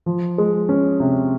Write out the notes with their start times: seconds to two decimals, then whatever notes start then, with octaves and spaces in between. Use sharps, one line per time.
0.06 F3
0.38 G#3
0.69 C#4
1.00 C3